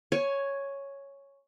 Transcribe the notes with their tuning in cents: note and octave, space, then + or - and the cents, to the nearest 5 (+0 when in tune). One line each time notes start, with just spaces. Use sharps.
C#5 +0 G#5 +15